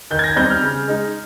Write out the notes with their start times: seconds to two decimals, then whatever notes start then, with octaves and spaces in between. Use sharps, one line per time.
0.11 D#3 G6
0.19 G#6
0.24 A#6
0.36 G3 C4 D#4 G6
0.50 F6
0.62 C#3
0.88 G#3 D#4